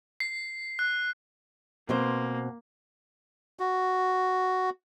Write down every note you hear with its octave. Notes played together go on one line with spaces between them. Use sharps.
C7
F#6
B2 A#3 C4 C5
F#4